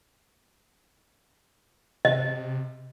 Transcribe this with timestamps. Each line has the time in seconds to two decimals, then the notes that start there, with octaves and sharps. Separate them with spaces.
2.05 C3 D#5